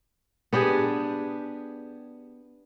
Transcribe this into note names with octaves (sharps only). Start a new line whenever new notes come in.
B3 D4 G4 G#4